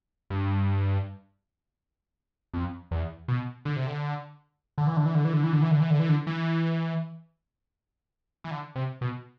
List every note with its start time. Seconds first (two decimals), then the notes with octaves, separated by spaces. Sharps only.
0.30 G2
2.54 F2
2.91 E2
3.28 B2
3.65 D3
3.76 C3
3.87 D3
4.78 D3
4.87 E3
4.97 D3
5.06 E3
5.15 D3
5.25 E3
5.33 D3
5.44 E3
5.53 D3
5.62 E3
5.71 D3
5.80 E3
5.90 D3
5.99 E3
6.09 D3
6.27 E3
8.44 E3
8.51 D3
8.76 C3
9.01 B2